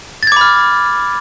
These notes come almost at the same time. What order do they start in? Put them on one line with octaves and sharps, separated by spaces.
A6 G#6 D6 B5 F6